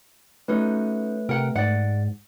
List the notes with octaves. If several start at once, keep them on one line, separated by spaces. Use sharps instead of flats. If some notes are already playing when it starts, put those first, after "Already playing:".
A3 C#4 D#4 F#4 B4
C3 A#4 F#5 G5
G#2 D5 F#5